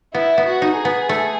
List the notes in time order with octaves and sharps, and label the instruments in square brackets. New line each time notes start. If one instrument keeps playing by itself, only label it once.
[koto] B3 [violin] E4
[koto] B3
[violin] F#4
[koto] D#4
[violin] G#4
[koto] B3
A3